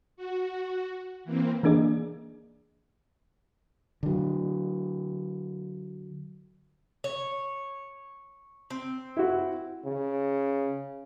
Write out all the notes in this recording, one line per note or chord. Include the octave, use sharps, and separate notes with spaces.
F#4
E3 A#3 C4
E3 A#3 D4 G#4 D5 D#5
D3 F#3
C#5
C4
E4 F#4
C#3